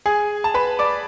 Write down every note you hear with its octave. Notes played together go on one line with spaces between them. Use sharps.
G#4 G#5
A5
B4 B5
D5 D6